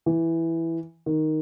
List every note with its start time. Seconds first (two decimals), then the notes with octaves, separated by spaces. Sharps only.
0.06 E3
1.06 D#3